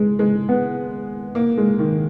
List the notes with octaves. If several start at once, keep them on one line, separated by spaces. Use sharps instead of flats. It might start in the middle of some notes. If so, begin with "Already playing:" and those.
Already playing: G#3
G#3
B3
A#3
G#3
D#3